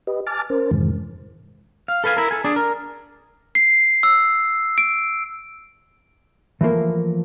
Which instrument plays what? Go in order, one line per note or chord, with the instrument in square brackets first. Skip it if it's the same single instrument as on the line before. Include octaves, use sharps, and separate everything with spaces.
[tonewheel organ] G4 B4 D#5
G#5 A5 D6 F6 A6
C#4 A#4 C5
F2 G#2 C3 D#3 E3 G#3
[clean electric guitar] F5
A4 B4 F5 G#5
E4 A#4
A4 G#5
D4 G#4 D5
A#4
[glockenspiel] C7
E6
D7
[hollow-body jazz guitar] E3 F3 A3 A#3